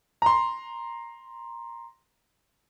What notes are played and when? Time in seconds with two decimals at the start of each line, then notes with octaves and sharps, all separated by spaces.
0.22 A#5 C6